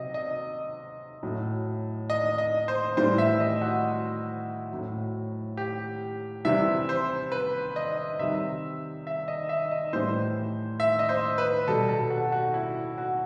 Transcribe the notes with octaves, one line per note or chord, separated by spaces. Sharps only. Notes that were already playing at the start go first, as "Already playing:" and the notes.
Already playing: C3 F#3 D#5
D#5
A2 F#3
D#5
D#5
C5
A2 E3 G3 C5
E5
D#5
F#4
A2 F#3
G4
C3 E3 G3 E5
C5
B4
D#5
C3 D#3 G3 E5
E5
D#5
E5
D#5
A2 E3 G3 C5
E5
D#5
C5
B4
B2 G3 A4
A4
F#4
F#4
E4
F#4